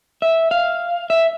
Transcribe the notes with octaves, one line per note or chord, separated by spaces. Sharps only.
E5
F5
E5